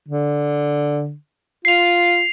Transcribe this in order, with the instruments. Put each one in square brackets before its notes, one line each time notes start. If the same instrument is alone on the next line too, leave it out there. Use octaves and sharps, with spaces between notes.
[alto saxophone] D3
[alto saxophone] F4 [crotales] C7 F7